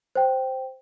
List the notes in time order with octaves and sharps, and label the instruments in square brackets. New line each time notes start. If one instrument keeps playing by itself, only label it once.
[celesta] C5 G5